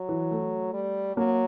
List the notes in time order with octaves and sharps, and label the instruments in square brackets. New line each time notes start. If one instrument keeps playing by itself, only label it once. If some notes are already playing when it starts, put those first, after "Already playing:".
Already playing: [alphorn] F#3
[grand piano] E3
A3
[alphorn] G3
[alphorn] F#3 [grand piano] A#3